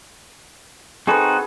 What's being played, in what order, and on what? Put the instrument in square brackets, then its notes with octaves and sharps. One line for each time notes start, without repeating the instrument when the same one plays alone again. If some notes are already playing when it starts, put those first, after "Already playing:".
[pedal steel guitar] C4 D#4 F#4 [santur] G#4 A4 B4